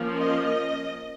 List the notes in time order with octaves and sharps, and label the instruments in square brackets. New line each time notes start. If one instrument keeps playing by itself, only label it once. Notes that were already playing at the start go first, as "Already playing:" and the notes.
Already playing: [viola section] F3 A#3 C#4
D#5